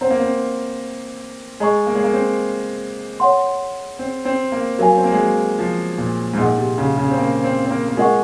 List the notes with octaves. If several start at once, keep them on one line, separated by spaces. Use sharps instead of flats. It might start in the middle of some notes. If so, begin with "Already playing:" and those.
C4 C5 F#5 A#5
A#3
C4
G#3 G#4 D#5 A#5 C#6
A#3
G#3
A#3
C4
C#5 F#5 C6
C4
C4
A#3
F#3 A#4 F5 G#5
C4
A#3
G#3
F#3
F3
A#2
G#2
A#2 D#4 G#4 D#5 F#5
C3
C#3
C#3
C4
A#3
C4
C4
A#3
A#3
G#3 F4 A#4 D#5 F#5 C#6